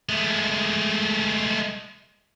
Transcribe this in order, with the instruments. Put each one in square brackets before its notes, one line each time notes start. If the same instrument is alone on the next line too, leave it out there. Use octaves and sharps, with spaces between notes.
[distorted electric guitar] G#3 A3